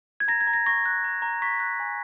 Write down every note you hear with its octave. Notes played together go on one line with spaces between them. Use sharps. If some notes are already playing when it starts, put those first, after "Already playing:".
G#6
A#5 A#6
G#6
A#5
A#6
C#6 A#6
F#6
A#5
A#5
C#6 B6
F#6
G#5